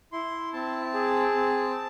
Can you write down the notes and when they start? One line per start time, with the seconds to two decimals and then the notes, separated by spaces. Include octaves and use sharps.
0.12 E4 C6
0.53 C4 A5
0.94 G#4
1.35 C4